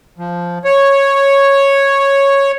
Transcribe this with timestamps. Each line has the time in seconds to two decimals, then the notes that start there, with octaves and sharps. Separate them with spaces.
0.18 F3
0.64 C#5